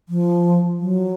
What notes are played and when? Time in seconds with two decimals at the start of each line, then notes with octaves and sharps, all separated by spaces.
0.09 F3
0.79 F#3